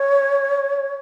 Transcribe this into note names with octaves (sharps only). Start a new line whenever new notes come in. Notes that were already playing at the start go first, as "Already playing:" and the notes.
Already playing: C#5